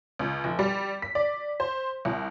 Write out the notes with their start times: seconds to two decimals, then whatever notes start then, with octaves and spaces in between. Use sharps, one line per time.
0.19 C#2
0.44 F1
0.59 G3
1.02 B6
1.15 D5
1.60 C5
2.05 C2